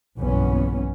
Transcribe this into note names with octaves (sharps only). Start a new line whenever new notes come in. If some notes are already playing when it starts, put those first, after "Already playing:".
F#1 B1 E2 G2 B3 C#4